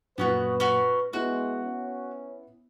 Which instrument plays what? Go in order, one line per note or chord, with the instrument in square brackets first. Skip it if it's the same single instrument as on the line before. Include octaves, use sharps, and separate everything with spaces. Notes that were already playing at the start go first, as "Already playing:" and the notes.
[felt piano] F#2 A#2 [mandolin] B3 C#4 F#4 [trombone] B4
[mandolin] C#4 F#4
[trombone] G#3 [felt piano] B3 E4 [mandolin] F#4
[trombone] C#4